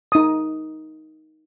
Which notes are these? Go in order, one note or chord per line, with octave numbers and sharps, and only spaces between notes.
D#4 D#6